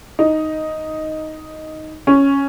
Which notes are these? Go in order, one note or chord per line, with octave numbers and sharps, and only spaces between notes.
D#4
C#4